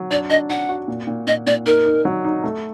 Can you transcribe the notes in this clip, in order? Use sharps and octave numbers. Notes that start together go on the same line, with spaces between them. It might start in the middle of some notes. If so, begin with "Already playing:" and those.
Already playing: F#3
D4 D5
D4 D#5
D4 F#5
F#4
A#2
A#2
A#2 D#5
A#2 D5
D#4 A#4
D#4
F#3
D#4
A3